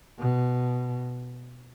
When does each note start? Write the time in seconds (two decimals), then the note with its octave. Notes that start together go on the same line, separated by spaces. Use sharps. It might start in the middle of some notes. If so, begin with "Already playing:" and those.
0.19 B2